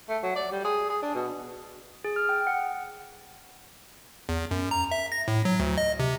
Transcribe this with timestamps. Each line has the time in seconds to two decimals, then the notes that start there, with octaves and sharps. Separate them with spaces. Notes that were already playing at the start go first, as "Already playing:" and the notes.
0.09 A3
0.23 F#3
0.36 D5
0.51 G3
0.64 G#4
0.90 G#4
1.02 D4
1.14 B2
2.04 G#4
2.16 F6
2.29 G5
2.47 F#5
4.29 E2
4.51 F#2
4.71 A#5
4.91 E5
5.12 A#6
5.28 A2
5.45 F#3
5.60 D2
5.78 D#5
5.99 C3